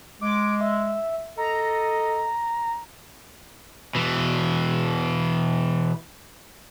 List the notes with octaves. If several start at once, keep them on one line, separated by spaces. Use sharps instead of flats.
G#3 D6
E5
A4 D#5 A#5
B2 E3